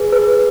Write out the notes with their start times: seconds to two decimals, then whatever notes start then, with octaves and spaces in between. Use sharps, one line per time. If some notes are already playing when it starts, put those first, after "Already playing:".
Already playing: G#4 B4
0.12 B4